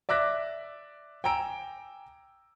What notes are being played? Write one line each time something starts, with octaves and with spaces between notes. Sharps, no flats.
D5 E5 D6 F#6 A#6 B6
G5 G#5 A#5 E6 D7